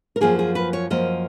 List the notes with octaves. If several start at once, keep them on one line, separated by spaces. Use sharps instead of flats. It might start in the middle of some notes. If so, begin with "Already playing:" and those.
A#4
F#2 F3 A#3 G#4
G#4
B4
C#5
F#2 F3 A#3 D#5